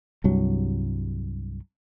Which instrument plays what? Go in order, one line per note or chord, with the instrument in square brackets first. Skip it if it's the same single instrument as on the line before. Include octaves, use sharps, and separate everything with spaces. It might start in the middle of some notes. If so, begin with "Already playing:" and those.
[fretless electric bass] C2 G2 F#3